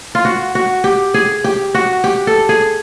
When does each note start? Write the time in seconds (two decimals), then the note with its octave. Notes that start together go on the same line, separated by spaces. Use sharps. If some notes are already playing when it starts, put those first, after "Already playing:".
0.15 F4
0.25 F#4
0.55 F#4
0.84 G4
1.14 G#4
1.44 G4
1.75 F#4
2.04 G4
2.27 A4
2.49 G#4